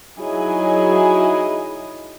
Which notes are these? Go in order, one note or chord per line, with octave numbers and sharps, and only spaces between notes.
F#3 D#4 E4 G#4 D#5 G#5